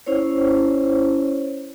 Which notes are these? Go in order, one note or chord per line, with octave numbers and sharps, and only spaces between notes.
C#4 E4 C5 C#5